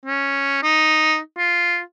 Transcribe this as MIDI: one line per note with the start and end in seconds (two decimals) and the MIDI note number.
0.06 0.62 61
0.63 1.17 63
1.38 1.80 65